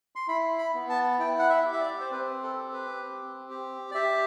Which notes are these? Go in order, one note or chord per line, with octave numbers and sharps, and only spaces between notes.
C6
E4 B5
B5
B3
A5
E4 G5
F#5
E5
G4
E5
D5
C5
C4 B4
A4
G4
B4
C4
G4
D5
G4 E5